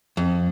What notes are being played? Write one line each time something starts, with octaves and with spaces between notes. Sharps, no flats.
F2